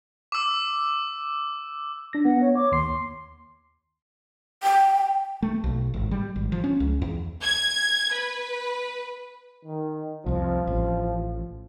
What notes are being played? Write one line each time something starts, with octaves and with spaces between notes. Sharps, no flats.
D6 E6
D4 A#6
B3 F#5
C#5
C#5 D6
D#2 C6 C7
G5
A3
B1
G#1
G3
G#1
F3
C#4
C#2
E2
G#6
B4
D#3
C2 F2 F3
A1